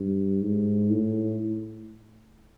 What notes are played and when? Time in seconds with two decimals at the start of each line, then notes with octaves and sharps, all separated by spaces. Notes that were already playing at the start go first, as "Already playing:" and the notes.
Already playing: G2
0.41 G#2
0.90 A2